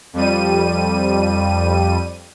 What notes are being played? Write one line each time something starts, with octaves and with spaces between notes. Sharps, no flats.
F2 G3 D#7